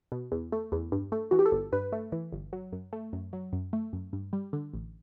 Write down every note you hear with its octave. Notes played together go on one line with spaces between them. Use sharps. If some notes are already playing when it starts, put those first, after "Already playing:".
B2
E2
A3
E2
G2
A3
E3 F#4
G4
A4
G1
G2 B4
A3
E3
G1
F#3
F#2
A3
F#2
F#3
F#2
A3
F#2
G2
G3
D3
A1